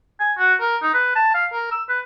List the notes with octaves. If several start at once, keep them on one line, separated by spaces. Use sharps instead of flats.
G#5
F#4
A#4
D#4
B4
A5
F5
A#4
E6
B4